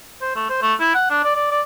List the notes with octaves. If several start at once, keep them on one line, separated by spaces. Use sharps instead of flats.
C5
A3
C5
A3
E4
F#5
D4
D5
D5
D5